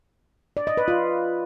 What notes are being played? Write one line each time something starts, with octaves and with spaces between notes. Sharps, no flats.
D5
D#5
B4
F4